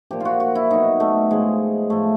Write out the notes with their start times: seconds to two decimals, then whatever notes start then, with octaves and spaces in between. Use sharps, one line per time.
0.11 A#2 F3 G4
0.20 F4 F#4
0.40 F#4
0.55 E4
0.70 B2 F#3 D#4
1.00 A3
1.31 A2 F3 G#3
1.90 A2 F3 A3